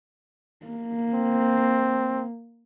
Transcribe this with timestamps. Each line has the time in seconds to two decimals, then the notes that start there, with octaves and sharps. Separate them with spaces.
0.66 A#3
1.14 C4